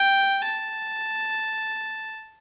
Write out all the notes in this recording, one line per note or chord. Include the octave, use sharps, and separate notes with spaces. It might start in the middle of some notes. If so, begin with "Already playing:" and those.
Already playing: G5
A5